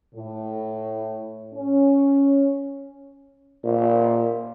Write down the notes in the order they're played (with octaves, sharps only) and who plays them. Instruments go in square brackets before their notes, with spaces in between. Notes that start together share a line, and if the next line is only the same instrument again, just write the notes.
[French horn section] A2
C#4
[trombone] A#2